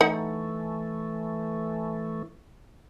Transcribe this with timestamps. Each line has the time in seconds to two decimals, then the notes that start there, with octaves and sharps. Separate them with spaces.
0.01 E3 A3 D#4 F#5